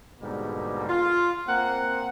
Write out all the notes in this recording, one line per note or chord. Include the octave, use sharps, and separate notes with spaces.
G#2 B2 D3 G3 A#3
F4
A#3 C4 F#5